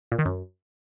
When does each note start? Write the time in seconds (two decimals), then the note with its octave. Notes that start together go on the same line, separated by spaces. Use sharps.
0.12 A#2
0.19 D#3
0.26 F#2